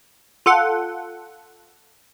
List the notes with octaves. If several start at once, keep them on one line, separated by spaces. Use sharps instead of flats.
F4 A4 F#5